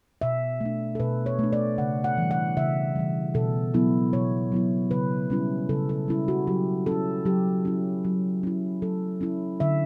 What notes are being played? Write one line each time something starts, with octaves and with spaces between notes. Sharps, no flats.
B2 E5
A3 D4
A4
B2 B4
C#5
A3 D4
D5
C#3 F#5
F#5
E3 G3
F#5
C#3 E5
E3 G3
B2 A4
F#3 B3 E4
B2 C#5
F#3 B3 E4
C#3 B4
G3 C#4 E4
C#3 A4
A4
G3 C#4 E4
F#4
F#3 G4
C#4 E4 A4
F#3 G4
C#4 E4
F#3
C#4 E4
F#3 A4
C#4 E4
D3 E5